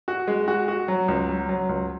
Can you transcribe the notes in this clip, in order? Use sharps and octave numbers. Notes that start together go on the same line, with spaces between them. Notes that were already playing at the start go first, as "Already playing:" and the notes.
F#4
G#3
F#4
F#4
F#3
C#2
F#3
F#3
C#2